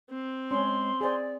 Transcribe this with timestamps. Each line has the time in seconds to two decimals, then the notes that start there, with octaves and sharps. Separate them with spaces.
0.10 C4
0.51 G#3 C#4 C6
1.01 G#4 C5 D5